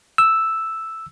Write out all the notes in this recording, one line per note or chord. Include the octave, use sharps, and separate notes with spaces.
E6